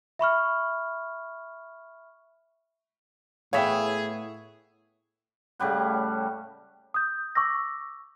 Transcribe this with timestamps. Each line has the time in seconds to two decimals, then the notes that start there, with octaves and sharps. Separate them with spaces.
0.19 E5 B5 C#6 F6
3.53 A2 B3 G#4 C#5 E5 F5 G5
5.59 A2 C#3 G3 F#5
6.94 D#6 G6
7.35 C#6 D6 E6 A#6